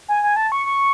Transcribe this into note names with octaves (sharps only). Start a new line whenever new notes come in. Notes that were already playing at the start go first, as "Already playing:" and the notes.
G#5
G#5
A5
C#6
C#6